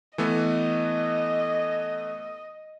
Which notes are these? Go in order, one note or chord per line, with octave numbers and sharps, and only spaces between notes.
E3 A3 B3 D#5